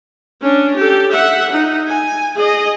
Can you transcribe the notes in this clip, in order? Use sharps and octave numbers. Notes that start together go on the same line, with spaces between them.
C#4 D4
G4 A4
E5 F#5
D#4
G#5
G#4 D#5